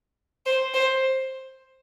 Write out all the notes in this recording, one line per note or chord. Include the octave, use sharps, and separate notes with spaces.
C5
C5